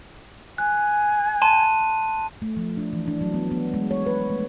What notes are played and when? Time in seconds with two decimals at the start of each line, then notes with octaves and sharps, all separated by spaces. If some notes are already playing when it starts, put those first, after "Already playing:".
0.58 G#5 F#6
1.42 A5 C6 D#7
2.42 A3
2.57 F3
2.77 D4
2.93 E3
3.08 D4
3.21 F#3
3.34 B3
3.51 B3
3.74 G#3
3.91 C#5
4.06 B4
4.29 A3